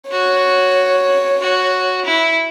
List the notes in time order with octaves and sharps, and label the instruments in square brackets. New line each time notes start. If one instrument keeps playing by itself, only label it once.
[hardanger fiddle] F#4 [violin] C#5
[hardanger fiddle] F#4
E4